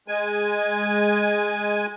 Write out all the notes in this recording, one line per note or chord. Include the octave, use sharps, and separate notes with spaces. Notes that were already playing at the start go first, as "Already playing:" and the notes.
G#3 G#5